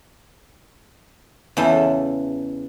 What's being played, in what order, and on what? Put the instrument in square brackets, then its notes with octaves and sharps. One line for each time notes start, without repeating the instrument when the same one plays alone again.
[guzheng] E2 C#3 E3 A4